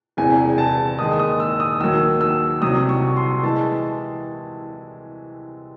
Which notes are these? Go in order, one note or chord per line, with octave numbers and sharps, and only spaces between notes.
E1 E2 C3 G#5
G#5
A5
D#2 D#3 G#3 D#6
D#6
E6
D#6
D#2 D#3 F#3 E6
E6
C2 C3 F#3 D#6
C#6
C6
E3 G#3 A5